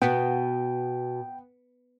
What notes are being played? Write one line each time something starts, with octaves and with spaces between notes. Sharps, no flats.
B2 B3 G5